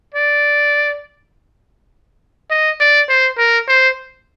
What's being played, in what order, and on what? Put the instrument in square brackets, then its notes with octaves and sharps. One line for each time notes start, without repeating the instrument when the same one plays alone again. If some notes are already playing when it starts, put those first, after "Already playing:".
[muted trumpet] D5
D#5
D5
C5
A#4
C5